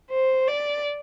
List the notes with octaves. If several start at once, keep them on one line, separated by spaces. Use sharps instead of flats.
C5
D5